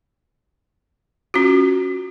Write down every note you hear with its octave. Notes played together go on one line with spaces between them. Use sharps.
C#4 F4 F#4